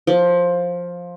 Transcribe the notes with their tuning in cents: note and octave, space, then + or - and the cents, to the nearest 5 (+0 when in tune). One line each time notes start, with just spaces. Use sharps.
F3 +10